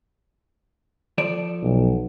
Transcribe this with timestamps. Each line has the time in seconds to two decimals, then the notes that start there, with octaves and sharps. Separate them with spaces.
1.18 F3 A4 D5
1.63 B1